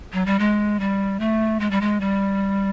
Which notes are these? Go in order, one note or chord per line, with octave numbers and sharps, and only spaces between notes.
F#3
G3
G#3
G3
A3
G#3
G3
G#3
G3